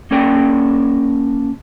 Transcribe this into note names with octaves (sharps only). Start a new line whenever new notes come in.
A#3 C#4 D4 A#4 D5 G5